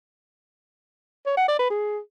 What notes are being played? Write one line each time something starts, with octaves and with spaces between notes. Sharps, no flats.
C#5
F#5
D5
B4
G#4